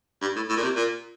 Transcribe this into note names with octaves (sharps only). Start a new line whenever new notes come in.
G2
A2
A2
A#2
C3
A#2